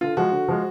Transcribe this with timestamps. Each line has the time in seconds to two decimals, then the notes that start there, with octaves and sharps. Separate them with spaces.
0.01 D3 F4
0.17 F3 G#3 F#4
0.32 D3
0.48 F3 G#3